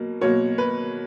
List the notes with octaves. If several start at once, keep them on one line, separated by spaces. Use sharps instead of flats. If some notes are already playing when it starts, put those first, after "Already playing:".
Already playing: B2 F#3 A#3
B2 F#3 A#3 C#5
B4